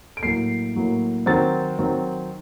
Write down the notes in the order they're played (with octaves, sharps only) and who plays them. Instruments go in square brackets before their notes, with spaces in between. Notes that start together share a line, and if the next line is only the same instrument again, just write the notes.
[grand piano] D7
A2 F#3 A#3 C7
A2 F#3 A#3
D#3 F#3 C4 A6
D#3 F#3 C4